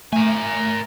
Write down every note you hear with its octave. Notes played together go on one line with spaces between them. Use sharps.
A3 A#4 G#5